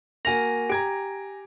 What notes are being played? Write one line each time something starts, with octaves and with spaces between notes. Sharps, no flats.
A#3 F#4 A#4 G#5 A#6 F7
G4 A#5 G#6 D7